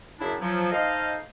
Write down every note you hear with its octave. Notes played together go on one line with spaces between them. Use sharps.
F#2 C#3 D4 E4
F3 F#3
D#4 A4 C5 D#5 F5